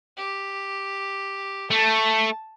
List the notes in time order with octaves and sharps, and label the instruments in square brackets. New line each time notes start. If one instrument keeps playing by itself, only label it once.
[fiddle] G4
[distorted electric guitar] A3 [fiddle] A5